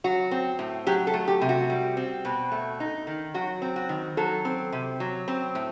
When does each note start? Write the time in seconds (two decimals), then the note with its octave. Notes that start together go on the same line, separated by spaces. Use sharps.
0.04 F#3 F#4
0.31 C4
0.59 A2
0.87 F#3 G4
1.07 A4
1.14 A3
1.28 G4
1.41 C3
1.49 F#4
1.70 G3
1.97 C4
2.25 B2
2.52 A3
2.80 D#4
3.07 D#3
3.34 F#3 F#4
3.62 C4
3.76 F#4
3.89 D#3
4.17 F#3 A4
4.45 C4
4.72 C3
5.00 F#3
5.28 C4
5.55 A2